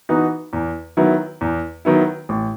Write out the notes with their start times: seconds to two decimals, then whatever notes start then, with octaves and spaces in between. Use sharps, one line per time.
0.09 E3 B3 D#4 F#4
0.53 E2
0.97 D#3 F#3 B3 E4
1.41 E2
1.85 D#3 F#3 B3 E4
2.29 A1